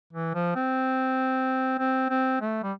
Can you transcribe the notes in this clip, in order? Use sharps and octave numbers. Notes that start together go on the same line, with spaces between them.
E3
F3
C4
C4
C4
A3
G3